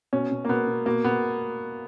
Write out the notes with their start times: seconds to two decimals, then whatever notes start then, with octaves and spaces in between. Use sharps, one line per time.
0.13 B2 C#4
0.31 B2
0.45 A#3
0.49 B2 B3
0.68 B2
0.86 B2 A#3
1.04 B2 B3